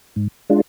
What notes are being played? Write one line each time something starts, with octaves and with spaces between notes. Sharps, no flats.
G#2
G#3 D4 F4